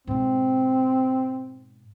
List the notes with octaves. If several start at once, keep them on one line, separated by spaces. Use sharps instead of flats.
G#2 B2 C4